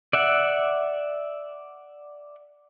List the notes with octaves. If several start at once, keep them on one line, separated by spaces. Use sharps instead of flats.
D5 E5 F#5